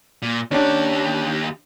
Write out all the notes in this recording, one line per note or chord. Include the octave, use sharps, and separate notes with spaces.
A#2
D#2 C#4 D4 G4